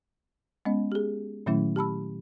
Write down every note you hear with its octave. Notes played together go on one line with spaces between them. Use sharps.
G#3 B3 C#4 D#5
G4 G#4
A#2 D#3 F#3 A3 C#4 E4
G4 A5 B5 E6